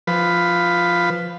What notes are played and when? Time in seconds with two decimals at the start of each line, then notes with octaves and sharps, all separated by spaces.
0.07 F3 B4